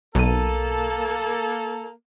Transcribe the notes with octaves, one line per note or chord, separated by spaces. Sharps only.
B1 A#3 A4 D#7